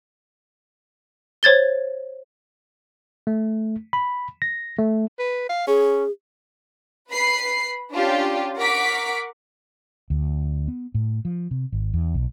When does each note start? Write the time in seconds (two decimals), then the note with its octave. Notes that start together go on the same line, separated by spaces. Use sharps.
1.43 C5 C#5 G#6 A6 G7
3.27 A3
3.93 B5
4.42 A#6
4.78 A3
5.19 B4
5.49 F5
5.68 C#4 G#4
7.11 B4 B5 C7
7.91 C#4 D4 F4 G4
8.57 A#4 F#5 C#6 D6 B6 D7
10.10 D2
10.68 B3
10.94 A2
11.25 F3
11.51 C3
11.72 G#1
11.94 E2
12.14 B1